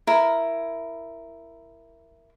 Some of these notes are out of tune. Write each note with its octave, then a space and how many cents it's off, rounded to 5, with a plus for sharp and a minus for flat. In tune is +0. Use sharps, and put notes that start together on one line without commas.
E4 +10 A#4 +0